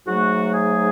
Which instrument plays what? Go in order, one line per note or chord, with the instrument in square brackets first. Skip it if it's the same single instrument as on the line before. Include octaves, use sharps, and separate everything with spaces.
[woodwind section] G#2 F#3 A3 F#4
G#4